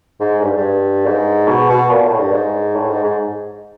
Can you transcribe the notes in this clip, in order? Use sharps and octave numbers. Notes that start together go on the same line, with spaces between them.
G#2
G2
G2
G#2
B2
B2
A#2
A2
G2
G#2
A2
G#2
G#2